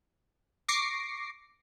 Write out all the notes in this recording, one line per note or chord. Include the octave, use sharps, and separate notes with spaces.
C#6 D6 A#6 C7 C#7